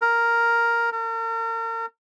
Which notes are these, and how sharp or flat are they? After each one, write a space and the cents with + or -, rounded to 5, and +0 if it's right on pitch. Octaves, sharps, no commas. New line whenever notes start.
A#4 +0
A#4 -40